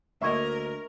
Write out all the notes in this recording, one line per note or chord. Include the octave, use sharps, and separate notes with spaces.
D2 A#3 A#4 D#5 E5 C#6 G#6